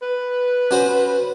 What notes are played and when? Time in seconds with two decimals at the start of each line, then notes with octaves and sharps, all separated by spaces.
0.02 B4
0.71 C#4 F#4 C5